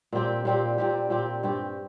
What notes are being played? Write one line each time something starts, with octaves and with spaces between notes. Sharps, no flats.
A#2 G3 C4 G4
A#2 G3 C4 G4
A#2 G3 C4 G4
A#2 G3 C4 G4
G2 G3 C4 G4